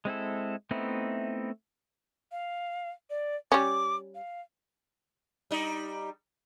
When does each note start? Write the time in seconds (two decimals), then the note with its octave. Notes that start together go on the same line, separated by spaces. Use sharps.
0.05 G#3 C4 E4 A4
0.71 A3 B3 C4 D#4 E4
2.32 F5
3.10 D5
3.52 G3 C#4 D6
4.15 F5
5.51 G3 D#4